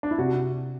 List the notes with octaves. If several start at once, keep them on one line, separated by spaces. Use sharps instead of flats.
D4
E4
C3 F#4